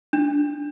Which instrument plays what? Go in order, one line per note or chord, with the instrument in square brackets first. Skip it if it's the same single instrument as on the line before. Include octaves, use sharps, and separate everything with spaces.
[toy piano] D4